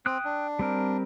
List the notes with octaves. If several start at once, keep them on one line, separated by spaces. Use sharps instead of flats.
C4 G5 D#6 F#6
D4
G3 C4 A#4